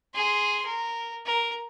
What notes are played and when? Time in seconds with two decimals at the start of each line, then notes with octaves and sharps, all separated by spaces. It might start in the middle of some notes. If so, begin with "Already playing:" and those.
0.14 G#4 C6
0.66 A#4
1.26 A#4